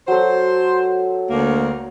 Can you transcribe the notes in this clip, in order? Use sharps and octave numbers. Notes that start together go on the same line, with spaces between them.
F#3 A4 C5
D2 A#3